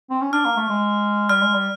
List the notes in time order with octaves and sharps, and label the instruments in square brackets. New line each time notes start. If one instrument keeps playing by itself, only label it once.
[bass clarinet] C4
C#4
[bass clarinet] D4 [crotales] F6
[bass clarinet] A#3
A3
G#3
[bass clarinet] G3 [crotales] F6
[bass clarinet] G#3
G3